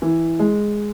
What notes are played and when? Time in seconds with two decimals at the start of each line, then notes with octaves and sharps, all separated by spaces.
0.02 E3
0.39 G#3